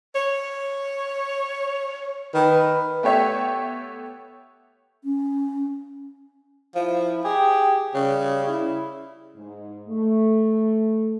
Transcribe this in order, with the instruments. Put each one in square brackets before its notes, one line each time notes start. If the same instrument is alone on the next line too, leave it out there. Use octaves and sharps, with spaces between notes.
[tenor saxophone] C#5
[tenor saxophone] D#3 [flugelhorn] B4
[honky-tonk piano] A3 B3 G4 C#5 E5
[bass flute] C#4
[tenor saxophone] F3 [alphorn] E4
[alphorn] G4 [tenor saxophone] G#4
[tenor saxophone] C#3 [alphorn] G3
[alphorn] E4
[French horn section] G#2
A3